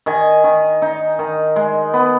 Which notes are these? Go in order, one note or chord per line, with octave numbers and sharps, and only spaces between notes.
D#3 D#5 G#5
D#3
D#4
D#3
G#3
B3